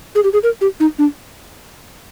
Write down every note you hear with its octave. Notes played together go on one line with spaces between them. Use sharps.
G#4
G4
G#4
A#4
G4
D#4
D4